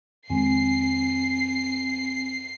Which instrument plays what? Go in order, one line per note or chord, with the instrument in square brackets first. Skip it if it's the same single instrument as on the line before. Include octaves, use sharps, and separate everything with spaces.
[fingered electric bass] F2 D#3 G#3 [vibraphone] C4 G#5 [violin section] C7